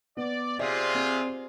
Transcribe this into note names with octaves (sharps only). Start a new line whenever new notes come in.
B3 D5
C3 F4 G#4 D5 F#5
C4 D5